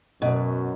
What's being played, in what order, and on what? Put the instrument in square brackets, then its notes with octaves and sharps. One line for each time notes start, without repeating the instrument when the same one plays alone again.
[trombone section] F#2 [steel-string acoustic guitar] B2